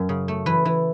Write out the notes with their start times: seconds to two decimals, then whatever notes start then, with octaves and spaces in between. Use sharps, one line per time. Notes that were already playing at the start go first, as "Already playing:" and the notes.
Already playing: F#2
0.09 C#3
0.28 A3
0.46 E3 B4
0.65 E3